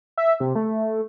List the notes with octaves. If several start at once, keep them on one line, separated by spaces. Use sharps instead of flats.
E5
C3
A3